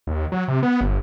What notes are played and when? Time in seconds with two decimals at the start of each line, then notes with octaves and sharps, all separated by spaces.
0.07 D#2
0.32 F#3
0.48 C3
0.63 B3
0.81 G1